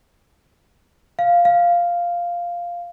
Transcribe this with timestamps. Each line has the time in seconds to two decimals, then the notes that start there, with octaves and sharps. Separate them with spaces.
1.19 F5
1.45 F5